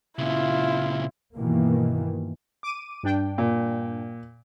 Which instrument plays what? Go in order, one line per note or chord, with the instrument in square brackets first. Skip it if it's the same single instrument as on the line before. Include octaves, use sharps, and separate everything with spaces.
[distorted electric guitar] A#2 C#3 [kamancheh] E4 F4
[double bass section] G2 B2 D#3 E3 A#3
[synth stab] D6 D#7
G2 D4 G5
[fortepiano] A#2